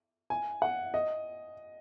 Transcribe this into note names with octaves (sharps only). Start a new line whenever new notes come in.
G#5
F#5
D#5